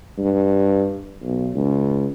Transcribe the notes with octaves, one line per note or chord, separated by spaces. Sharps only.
G2
B1
C#2